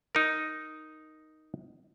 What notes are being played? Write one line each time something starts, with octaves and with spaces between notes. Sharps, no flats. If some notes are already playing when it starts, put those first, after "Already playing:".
D#4 A#4